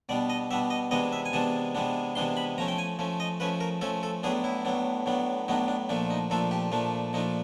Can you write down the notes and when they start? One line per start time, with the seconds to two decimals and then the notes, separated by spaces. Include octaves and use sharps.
0.09 B2 G3 B3 D4 D5
0.30 D#5
0.51 B2 G3 B3 D4 E5
0.70 D#5
0.91 C3 E3 G#3 B3 D4 D#5
1.13 E5
1.26 G#5
1.33 C3 E3 G#3 B3 D4 A5
1.75 C3 E3 G#3 B3 D4
2.15 C3 E3 G#3 B3 D4 C6
2.37 B5
2.58 F3 A3 C#4 A#5
2.68 G5
2.78 G#5
2.99 F3 A3 C#4
3.20 D#5
3.40 F3 A3 C#4 B4
3.61 A#4
3.81 F3 A3 C#4 A4
4.03 A4
4.23 A2 F#3 B3 D4 G#4
4.44 E4
4.65 A2 F#3 B3 D4
5.06 A2 F#3 B3 D4
5.48 A2 F#3 B3 D4 D#4
5.68 D4
5.89 A#2 F3 A3 D4
6.10 D#4
6.30 A#2 F3 A3 D4 A4
6.51 G4
6.72 A#2 F3 A3 D4
7.13 A#2 F3 A3 D4 D#4